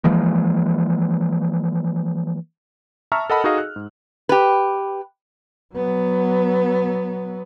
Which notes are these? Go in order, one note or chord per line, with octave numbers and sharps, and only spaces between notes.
E3 F3 G#3 A#3
E5 A5 A#5 C#6 E6 F6
A4 A#4 D#5 F#5 A5 B5
D#4 F#4 G#4 A4 D#5 F5
F#6
G#2
G4 B4
F#3 B3